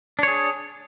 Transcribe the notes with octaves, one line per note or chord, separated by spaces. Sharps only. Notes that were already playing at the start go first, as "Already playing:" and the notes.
D4 G#4 C#5